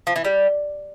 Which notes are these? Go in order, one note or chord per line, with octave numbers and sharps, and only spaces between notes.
F3
E3
G3